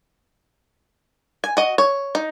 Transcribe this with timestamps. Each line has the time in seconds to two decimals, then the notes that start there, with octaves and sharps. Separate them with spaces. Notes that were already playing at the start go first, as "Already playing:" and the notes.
1.44 G#5
1.57 F#4 D#5
1.78 C#5
2.15 D#4